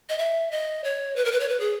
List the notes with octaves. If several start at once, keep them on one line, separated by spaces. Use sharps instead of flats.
D#5
E5
D#5
C#5
B4
A#4
B4
C#5
B4
G#4